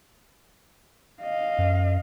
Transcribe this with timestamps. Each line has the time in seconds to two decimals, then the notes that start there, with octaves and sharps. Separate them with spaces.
1.22 D#5 F5
1.58 F#2